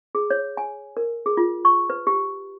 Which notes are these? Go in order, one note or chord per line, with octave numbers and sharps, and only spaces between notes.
G#4
C#5
G#5
A#4
G#4
F4
C#6
B4
G4